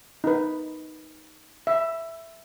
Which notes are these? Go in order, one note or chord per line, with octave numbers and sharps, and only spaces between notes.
D#4 B4
E5